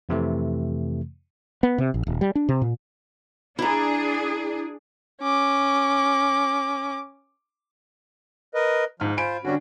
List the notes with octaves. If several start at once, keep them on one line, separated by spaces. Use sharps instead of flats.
F2 C3 E3 A3
B3
C3
A#1
D#1
G3
D4
C3
A#2
D4 E4 G#4 A#5
C#4 D6
A#4 B4 D#5
G#2 F3 F6
F4 C5 G#5 B5 D7
D3 G3 C#4 D4 F#4